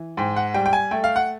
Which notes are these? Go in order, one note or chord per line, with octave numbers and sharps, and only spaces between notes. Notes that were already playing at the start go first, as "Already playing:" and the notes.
Already playing: E3
G#2 G5
F#5
G3 G5
G5
G#5
A3 G5
F5
F#5